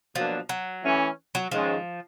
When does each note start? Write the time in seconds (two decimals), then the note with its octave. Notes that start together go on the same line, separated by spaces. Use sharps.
0.15 B2 F3 F#3 A#3 D4
0.49 F#3
0.84 E3 A3 C#4
1.35 F#3
1.51 G#2 D#3 F3 G#3 C#4